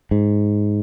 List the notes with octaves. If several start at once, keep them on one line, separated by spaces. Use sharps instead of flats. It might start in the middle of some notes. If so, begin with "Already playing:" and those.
G#2